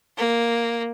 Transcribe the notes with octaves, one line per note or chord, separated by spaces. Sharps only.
A#3